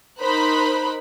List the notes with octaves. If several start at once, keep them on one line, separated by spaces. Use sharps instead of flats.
D#4 A#4 C5 B5 F#6